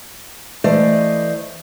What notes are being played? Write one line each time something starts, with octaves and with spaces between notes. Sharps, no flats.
E3 A3 C5 D5 D#5